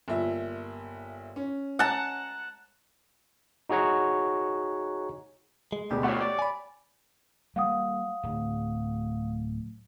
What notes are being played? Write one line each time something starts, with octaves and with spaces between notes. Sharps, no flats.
G1 A#2 E5
C#4
F#5 A5 A#5
D#4 F#4 G#4 C#5 F#5 A#5
G#3
D2 B2 G#3 G4
A3 F4 C#5 F#5
D5
G#5 B5
G3 A#3 F5 F#5 D#6
D1